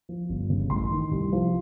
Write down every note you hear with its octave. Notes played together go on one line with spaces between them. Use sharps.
F3
G1
C#3
A1 C6
D#3
C2
F3